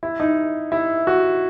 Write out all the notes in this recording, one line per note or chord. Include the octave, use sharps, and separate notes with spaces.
E4
D#4
E4
F#4